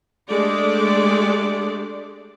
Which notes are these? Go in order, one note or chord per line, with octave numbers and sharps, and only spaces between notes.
G#3 A3 D4 G4 A4 D5